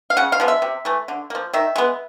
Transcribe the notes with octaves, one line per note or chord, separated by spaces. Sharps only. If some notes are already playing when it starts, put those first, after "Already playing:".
F5
C#3 F#5
F5
F3 G#3 B3
E5
C3
E3 A3
D3
F3 A#3
D#3 E5
G#3 B3